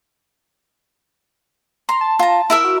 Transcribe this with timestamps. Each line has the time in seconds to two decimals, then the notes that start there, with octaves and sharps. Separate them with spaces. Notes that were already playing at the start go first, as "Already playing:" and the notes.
1.89 A#5 C6
2.01 A5
2.19 F4 A#5
2.50 E4 A#4 E5
2.64 F#4